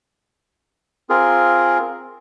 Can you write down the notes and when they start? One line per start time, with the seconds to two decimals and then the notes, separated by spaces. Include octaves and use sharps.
1.10 C4 F4 G#4 A#4